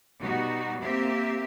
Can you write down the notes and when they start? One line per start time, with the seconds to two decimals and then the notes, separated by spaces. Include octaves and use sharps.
0.21 B2 G3 D#4 F#4
0.83 A#3 C4 G4 E5